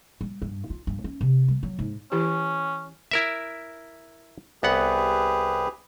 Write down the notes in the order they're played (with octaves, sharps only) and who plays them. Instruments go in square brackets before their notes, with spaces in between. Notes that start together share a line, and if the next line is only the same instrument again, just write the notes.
[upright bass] G3
G2
F4
G2
C#4
C3
G3
F#3
G#2
[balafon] E3 E4 G4 [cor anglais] C#4
[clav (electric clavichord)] E4 A#4 E5
[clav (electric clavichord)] C2 B3 F#5 [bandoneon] G4 G#4 B4